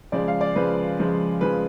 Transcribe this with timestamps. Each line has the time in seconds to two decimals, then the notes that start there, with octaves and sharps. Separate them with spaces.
0.12 C#3 F3 G#3 D5
0.28 F5
0.41 D5
0.55 C#3 F3 G#3 B4
0.99 C#3 F3 G#3
1.41 C#3 F3 G#3 B4